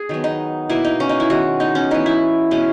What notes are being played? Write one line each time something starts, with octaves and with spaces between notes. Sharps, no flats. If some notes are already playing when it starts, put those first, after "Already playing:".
Already playing: G#4
D#3 F#3 B3
D#4
B2 A#3 E4
D#4
C#4
D#4
E4
D#3 G#3 B3 F#4
D#4
C#4
E3 B3 D#4
E4
B2 G#3 B3 C#4